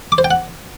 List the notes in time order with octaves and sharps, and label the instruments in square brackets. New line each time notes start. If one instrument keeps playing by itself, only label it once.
[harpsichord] D6
C5
G5
F#5